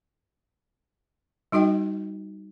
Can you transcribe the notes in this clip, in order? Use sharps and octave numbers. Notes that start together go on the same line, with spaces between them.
G3 D#4 F#4 D#5 G5